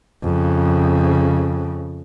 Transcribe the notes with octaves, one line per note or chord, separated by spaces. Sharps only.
F2 C#3